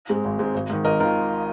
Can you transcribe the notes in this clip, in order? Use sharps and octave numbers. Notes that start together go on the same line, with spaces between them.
G#2 G#3 C4
G#1
G#2 G#3 C4
G#1
G#2 D#3
G#1 A#4 D#5
D#3 F4 A#4